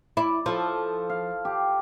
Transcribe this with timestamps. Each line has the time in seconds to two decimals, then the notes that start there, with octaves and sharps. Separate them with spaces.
0.17 E4 D5
0.46 F3 F4 A4
1.09 F5
1.45 G4